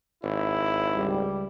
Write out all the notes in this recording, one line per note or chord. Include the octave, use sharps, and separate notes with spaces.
G#1 E4
C#2 G3